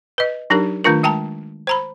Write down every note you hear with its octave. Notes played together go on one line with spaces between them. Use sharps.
B4 D#5
F#3 D4 D#4 G4 A#4
D#3 A3 D4 F4 A#4
G#3 G5 A5 A#5
C5 A#5 B5